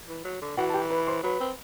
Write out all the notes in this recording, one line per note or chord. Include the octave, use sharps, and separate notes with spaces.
E3
F#3
D3
E3 F#4 F#5
A5
G4 G5
B4 B5
C5 C6
F#3 B4 B5
C4